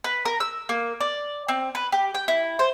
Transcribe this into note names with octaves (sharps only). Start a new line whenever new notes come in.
B4
A#4
E6
A#3
D5
C4
B4
G4
G5
E4
C5